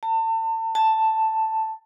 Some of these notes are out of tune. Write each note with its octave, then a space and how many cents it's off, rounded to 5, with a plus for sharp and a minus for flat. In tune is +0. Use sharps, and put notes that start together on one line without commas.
A5 +35
A5 +5